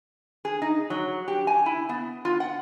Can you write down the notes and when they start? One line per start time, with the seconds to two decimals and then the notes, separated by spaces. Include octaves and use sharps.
0.45 G#4
0.62 D#4
0.90 F#3
1.28 G4
1.47 G#5
1.66 E4
1.89 B3
2.25 F4
2.40 F#5